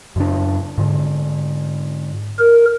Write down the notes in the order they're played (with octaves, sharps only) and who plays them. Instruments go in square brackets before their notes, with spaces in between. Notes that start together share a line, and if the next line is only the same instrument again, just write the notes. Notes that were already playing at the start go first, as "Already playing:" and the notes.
[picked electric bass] F#2 C#3 D4
G#2 D3
[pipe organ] A#4